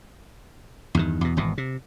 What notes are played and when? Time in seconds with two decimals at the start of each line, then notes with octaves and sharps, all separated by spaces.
0.95 E2 G2 D#3
1.21 E2 B2
1.37 G#1 E2 B2
1.58 C3